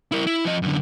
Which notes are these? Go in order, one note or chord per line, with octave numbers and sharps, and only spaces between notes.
E4 A#4
E4
F3 D#5
F#2 D3